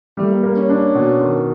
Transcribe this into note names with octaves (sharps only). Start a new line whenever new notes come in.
G3 A3
A#3
A#3
C#4
C#4 D4
B2
D#3